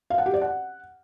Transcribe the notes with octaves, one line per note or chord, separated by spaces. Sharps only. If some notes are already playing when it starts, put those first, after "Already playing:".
F5
F#5
G4
D5
F#5